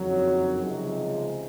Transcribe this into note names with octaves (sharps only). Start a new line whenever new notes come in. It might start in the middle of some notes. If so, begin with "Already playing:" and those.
Already playing: F#1 F2 D#3 F#3
C#2 C3 F3 G#3 D#4